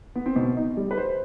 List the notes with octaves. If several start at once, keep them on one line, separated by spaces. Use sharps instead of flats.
B3
C4
B2 D#4
D#4
G3
B4
C5